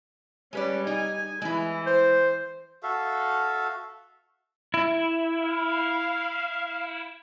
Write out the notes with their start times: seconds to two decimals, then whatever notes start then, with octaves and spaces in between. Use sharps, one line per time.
0.53 G3 G#3 C#4 B4 D5
0.87 D#4 G#5
1.42 E3 G#3 E4
1.86 C5
2.83 F#4 A4 E5 F5
4.74 E4
5.39 F5